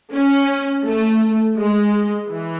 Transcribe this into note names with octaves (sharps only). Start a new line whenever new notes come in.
C#4
A3
G#3
E3